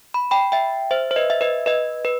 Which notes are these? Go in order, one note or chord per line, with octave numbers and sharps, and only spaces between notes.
B5
G5 B5
E5 G5
C5 E5
C5
B4 D#5
E5
B4 D#5
B4 D#5
B4